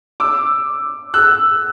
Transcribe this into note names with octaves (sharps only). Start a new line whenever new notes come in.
D6 E6
E6 F#6